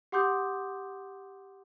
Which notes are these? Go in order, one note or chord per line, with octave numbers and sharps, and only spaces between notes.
G4 F#5 C6 D6 D#6 G6